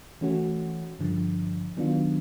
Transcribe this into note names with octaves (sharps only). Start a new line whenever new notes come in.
E3 A3 C#4 F#4
G2 D3 F3
D#3 F#3 B3 D4 F4